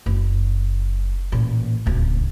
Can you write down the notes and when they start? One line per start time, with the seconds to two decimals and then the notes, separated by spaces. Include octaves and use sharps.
0.06 F#1 D4
1.32 A1 A#2
1.86 D1 C#2